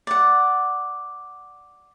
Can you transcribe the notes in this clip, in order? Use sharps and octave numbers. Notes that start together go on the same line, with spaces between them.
D5 F#5